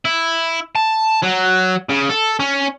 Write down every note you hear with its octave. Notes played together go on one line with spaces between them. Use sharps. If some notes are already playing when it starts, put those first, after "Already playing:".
E4
A5
F#3
C#3
A4
C#4